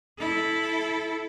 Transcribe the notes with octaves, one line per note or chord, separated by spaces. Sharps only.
E4 A4